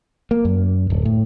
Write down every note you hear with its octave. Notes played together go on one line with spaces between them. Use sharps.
A#3
F#2
D1
A2